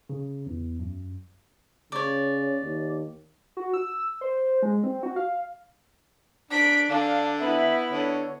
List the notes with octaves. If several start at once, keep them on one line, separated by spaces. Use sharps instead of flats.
C#3
E2
F#2
C#3 C#5 D5
D#2
F#4
E6
C5
G#3
C4
F#4
F5
D4 B6 D7
D3 D4 F5
B3 E4 E5
D3 C#5